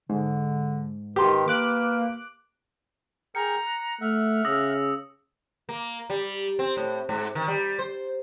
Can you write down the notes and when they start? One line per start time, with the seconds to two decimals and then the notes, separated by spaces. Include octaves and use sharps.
0.09 G#2 D3
1.16 D#3 G4 B4 C6
1.48 A#3 D6 F#6 D7
3.35 G#4 A#4 G5 A#5 C#7
3.66 F#6
4.01 A3 E5 F#5 F6
4.45 C#3 D#6 E6 A#6
5.69 A#3
6.10 G3
6.59 C4
6.77 A2
7.09 G#2
7.35 D#3
7.48 G3
7.79 C5